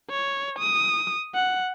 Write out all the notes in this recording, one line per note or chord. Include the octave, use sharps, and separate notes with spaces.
C#5
D#6
F#5